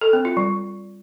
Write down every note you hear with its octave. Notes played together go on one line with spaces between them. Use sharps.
A4
C4
F4
G3